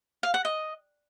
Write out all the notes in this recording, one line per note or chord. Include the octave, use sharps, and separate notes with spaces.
F5
F#5
D#5